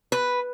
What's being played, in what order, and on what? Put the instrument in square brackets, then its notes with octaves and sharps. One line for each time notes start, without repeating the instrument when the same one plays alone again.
[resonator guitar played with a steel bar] B4